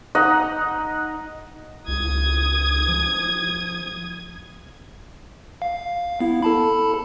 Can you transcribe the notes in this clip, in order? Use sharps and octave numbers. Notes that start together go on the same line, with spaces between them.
D#4 D#5 F#5
C#2 D#6 G#6
F3
F5
B3 E4
A4 A5 B5